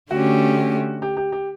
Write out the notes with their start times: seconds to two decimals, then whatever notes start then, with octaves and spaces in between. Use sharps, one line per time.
0.10 D3 A3 C#4 F#4 G4
1.02 G4
1.17 G4
1.32 G4